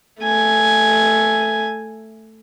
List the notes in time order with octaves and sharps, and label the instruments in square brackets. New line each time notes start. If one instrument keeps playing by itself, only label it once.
[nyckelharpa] A3 G#5